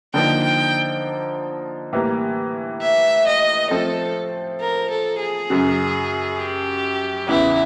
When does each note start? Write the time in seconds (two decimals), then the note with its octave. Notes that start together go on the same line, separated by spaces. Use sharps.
0.14 D3 F3 A#3 D#4 G5
0.43 G5
1.92 A2 E3 G3 A#3
2.82 E5
3.27 D#5
3.70 F3 A3 C4 A4
4.60 A#4
4.90 A4
5.20 G#4
5.50 F#2 C#3 F#3
6.39 G4
7.28 E2 C#3 E3 E4